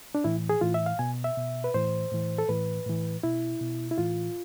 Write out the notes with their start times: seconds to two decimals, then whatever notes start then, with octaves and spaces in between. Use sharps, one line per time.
0.15 D4
0.24 A2 E3 E4
0.49 G#4
0.61 A2 E3 F4
0.74 E5
0.86 F5
0.99 B2 G#5
1.24 E5
1.37 B2
1.64 B4
1.74 A2 E3 C5
2.12 A2 E3
2.38 A4
2.49 A2 E3 B4
2.86 A2 E3
3.23 B2 E4
3.61 B2
3.91 E4
3.98 A2 E3 F4